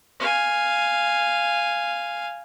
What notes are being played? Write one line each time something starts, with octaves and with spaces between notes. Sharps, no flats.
F5 G#5